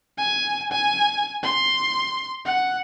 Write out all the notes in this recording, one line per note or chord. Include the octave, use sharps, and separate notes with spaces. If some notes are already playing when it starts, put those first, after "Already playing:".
G#5
G#5
C6
F#5